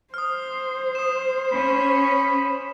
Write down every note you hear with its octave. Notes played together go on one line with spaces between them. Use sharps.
C5 D#6 F6
D#6 E7
C#4 B5